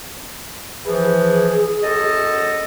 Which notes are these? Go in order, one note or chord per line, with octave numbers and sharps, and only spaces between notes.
E3 F3 G#4
F#2 A4 D#5